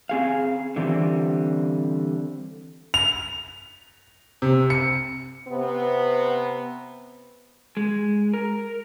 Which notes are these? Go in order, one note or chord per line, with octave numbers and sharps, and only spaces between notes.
C4 G#4 F5
D3 E3 G3 C4
F7
C3
C#7
C3 B3
G#3
A#4